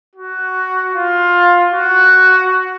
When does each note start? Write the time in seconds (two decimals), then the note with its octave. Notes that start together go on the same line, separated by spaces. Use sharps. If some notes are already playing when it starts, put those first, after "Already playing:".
0.15 F#4
0.94 F4
1.73 F#4